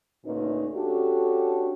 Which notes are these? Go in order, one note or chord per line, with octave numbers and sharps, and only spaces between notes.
D2 A#2 C#4 D#4 B4
C#4 D4 F#4 G4 A4